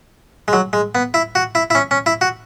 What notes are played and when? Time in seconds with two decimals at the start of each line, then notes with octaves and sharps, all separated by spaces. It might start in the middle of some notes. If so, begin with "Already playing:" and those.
0.48 G#3
0.53 F#3
0.73 G#3
0.95 B3
1.14 E4
1.35 F#4
1.55 E4
1.70 E4
1.75 C#4
1.91 C#4
2.06 E4
2.21 F#4